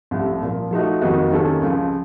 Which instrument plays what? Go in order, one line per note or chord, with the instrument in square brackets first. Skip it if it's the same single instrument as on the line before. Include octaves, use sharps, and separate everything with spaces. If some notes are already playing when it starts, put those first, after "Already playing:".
[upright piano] C2 C3 F3 A3
A#2 F3 A#3
F3 A3 D#4 F#4
F2 D#3 A#3 D#4 F#4
C3 D#3 A#3 C#4 A4
C#2 C#3 F3